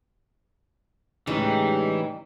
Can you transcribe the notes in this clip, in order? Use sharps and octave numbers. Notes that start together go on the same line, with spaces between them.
A2 C#3 E3 G3 G#3 C#4 D#4 G4